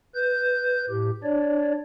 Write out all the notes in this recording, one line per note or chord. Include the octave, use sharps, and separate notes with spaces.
B4 G6
A2 G4
D4 C#5 D5